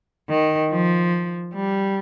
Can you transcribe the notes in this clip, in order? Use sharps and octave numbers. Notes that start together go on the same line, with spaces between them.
D#3
F3
G3